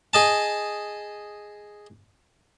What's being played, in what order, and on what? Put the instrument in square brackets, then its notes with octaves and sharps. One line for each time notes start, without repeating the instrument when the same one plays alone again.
[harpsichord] G#4 D#5 A5